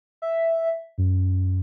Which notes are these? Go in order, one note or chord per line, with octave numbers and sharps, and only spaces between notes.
E5
F#2